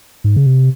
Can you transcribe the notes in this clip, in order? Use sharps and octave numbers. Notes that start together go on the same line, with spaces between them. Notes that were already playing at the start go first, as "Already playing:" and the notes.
G#2
C#3
C3